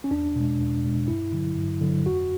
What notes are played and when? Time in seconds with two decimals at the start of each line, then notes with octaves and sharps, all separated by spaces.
0.04 C#4
0.11 E2 D4
0.36 B2 G#3
0.59 E2
0.84 B2 G#3
1.08 G2 E4
1.32 D3 F#3
1.56 G2
1.81 D3 F#3
2.06 F2 F#4